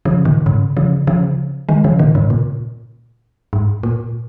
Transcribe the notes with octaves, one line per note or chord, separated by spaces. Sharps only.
C#3 F3
A#2 D#3
G#2 C#3
C#3 F3
C#3 F3
D#3 G#3
C#3 F3
A#2 D#3
G#2 C#3
A#2
G#2
A#2